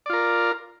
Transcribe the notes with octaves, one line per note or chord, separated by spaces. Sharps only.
F4 A#4 D5